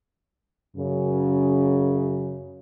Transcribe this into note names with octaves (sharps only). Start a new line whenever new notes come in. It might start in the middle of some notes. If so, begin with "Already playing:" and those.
F#2 C#3